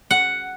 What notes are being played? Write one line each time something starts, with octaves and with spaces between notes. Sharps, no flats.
F#5